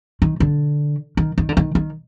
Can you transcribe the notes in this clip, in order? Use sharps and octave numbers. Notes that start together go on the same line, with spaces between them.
D#3
D3
D#3
D#3
D3
D#3
D#3